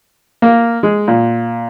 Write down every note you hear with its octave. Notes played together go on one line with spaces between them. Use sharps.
A#3
G#3
A#2